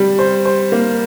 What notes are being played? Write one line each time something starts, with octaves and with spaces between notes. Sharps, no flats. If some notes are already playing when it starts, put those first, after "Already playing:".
Already playing: G3
C5
C5
A#3